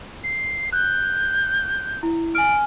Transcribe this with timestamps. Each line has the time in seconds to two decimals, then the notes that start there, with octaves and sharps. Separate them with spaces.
0.24 C7
0.73 F#6 G6
2.03 E4
2.35 G#5 F6 D7